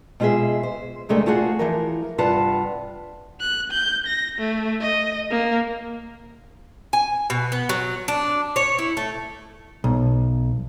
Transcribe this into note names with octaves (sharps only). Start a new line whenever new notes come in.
B2 G#3 F4 G4 G#4 E5
C5
E2 C3 G#3 A3 D4 A#4
A3 F4 F#4 G#4 F#5
E3 F3 A#4
G2 C3 F4 B4 F#5 A5
F#6
G6
A#6
A3
D#5
A#3
G#5
B2
B3
F#3
D4
C#5
E4
A3
B1